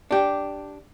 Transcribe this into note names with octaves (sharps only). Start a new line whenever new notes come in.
D4 G4